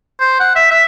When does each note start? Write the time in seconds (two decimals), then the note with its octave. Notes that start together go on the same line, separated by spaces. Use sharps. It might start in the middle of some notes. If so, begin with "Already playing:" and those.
0.20 C5
0.40 F#5
0.56 E5
0.71 E5